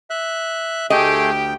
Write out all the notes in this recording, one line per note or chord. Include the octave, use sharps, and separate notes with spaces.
E5 F#6
D2 A3 G4 G#4 D#5 G5